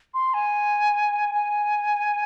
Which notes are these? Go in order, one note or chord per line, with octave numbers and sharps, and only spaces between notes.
C6
G#5
G#5